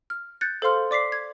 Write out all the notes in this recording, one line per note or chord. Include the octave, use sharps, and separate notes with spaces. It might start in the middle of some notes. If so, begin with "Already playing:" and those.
F6
F#6 G6 A6 C#7
A4 C5 F5 C6 F6
D5 D6 B6 C7
G#6